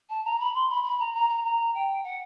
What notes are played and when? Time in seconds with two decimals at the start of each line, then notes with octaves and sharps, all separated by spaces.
0.09 A5
0.24 A#5
0.39 B5
0.54 C6
0.69 B5
0.84 B5
0.99 A#5
1.14 A#5
1.29 A#5
1.44 A#5
1.74 G5
2.03 F#5